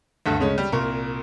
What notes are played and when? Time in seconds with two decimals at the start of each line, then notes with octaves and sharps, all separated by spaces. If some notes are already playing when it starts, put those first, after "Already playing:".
0.26 D2 G2 D3
0.40 C#3 G#3 A3 C#4
0.58 G3
0.72 C2 A#2 A#4 C#6